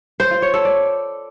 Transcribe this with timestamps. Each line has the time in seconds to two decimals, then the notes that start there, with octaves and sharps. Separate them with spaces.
0.20 C5
0.31 F4
0.42 C#5
0.54 A4
0.65 D5